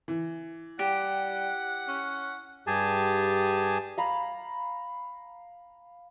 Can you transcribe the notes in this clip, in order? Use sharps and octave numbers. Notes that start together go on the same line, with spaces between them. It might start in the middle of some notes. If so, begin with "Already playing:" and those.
E3
G3 G4 F#5
C#4
G2 G4 G#4 G#5 A5
F5 A#5 B5